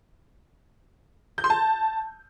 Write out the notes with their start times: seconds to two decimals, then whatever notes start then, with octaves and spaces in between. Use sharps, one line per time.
1.38 G6
1.44 C6
1.50 A5